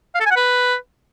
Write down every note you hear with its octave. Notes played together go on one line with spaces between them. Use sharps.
F5
A4
G#5
F#5
B4